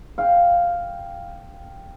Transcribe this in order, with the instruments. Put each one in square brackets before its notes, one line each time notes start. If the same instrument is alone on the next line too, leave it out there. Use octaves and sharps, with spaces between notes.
[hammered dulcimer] F5 G5